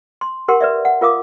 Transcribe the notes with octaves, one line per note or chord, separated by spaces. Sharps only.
C6
G4 A#4 F#5 C6
B4 D5 E5
F#5
F4 A#4 F5 D6 D#6